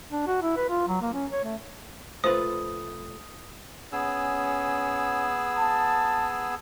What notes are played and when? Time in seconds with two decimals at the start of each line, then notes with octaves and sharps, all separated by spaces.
0.11 D4
0.27 F#4
0.42 E4
0.57 B4
0.69 F4
0.88 F#3
1.02 A#3
1.14 C#4
1.31 C#5
1.44 A3
2.24 F1 A3 F4 B4 C5 D#6
3.92 B3 C#4 G#4 E6
5.57 A5